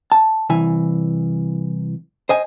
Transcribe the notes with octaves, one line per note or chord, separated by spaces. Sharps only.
A5
C2 E3 G#5
C5 D#5 G#5